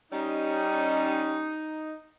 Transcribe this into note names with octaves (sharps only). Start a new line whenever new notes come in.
G3 C#4 D#4